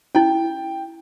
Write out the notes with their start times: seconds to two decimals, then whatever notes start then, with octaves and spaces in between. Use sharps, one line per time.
0.15 C#4 E4 G5